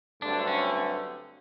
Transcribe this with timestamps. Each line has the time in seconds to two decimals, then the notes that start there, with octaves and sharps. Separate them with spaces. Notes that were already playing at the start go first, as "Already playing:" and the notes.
0.22 G2 D3 F#3 A3 C4 D4
0.47 C#4